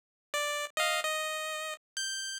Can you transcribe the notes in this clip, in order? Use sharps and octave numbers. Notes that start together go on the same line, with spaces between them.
D5
D#5 F5
D#5
G6